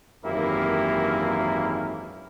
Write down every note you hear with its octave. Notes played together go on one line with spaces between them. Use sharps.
G#1 F#2 E3 A#3 E4 G4